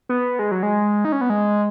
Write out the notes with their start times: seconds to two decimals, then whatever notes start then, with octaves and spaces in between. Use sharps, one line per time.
0.09 B3
0.39 G#3
0.51 F#3
0.63 G#3
1.05 D#4
1.12 C#4
1.21 B3
1.30 G#3